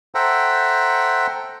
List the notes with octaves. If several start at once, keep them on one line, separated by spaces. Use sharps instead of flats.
A4 C5 E5 F#5 G5 A#5